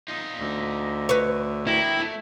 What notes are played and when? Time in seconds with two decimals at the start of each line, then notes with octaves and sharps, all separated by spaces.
0.08 D#4 F4
0.39 D2
1.09 B4 C#5
1.67 E4 A#4 G5
1.99 A3